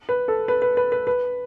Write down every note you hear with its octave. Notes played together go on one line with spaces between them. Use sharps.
B4
A4
B4
B4
B4
B4
B4